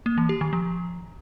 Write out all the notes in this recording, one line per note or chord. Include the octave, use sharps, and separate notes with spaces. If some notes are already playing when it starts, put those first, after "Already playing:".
A#3
E3
G4
D#3
F3